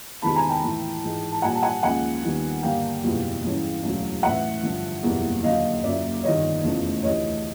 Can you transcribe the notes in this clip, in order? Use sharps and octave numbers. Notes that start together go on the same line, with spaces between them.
E2 C3 D#3 G#3 B3 A5 B5
G#5 A#5
G5 A5
A2 E3 A3
G#2 E3 G#3
A5
A#1 A#2 G3 F#5 G#5
A5
F#5 G#5
D#2 C#3 F3 G#3 F#5 G#5
D#2 D#3 G3 B3
G2 D3 G3 A#3 D4 F5 G5
F#1 E2 B2 G3
G2 E3 G#3 C#4
E1 D2 C#3 F#3
A1 A2 E3 E5 F#5
G2 D3 F3
F#1 E2 B2 G3 A#3
D#2 D3 F#3 D#5 F5
F#1 F#2 C#3 F#3 A#3 D5 E5
G1 F2 C3 D#3 C#5 D#5
F1 E2 C#3 F3 A3
D2 C3 E3 C#5 D#5